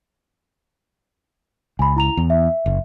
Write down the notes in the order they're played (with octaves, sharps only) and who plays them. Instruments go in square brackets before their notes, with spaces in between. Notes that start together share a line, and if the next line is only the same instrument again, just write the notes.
[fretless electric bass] C#2 [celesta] G#5 B5
[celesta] E4 A#5 F7
[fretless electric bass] E2
[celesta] E5
[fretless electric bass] F#1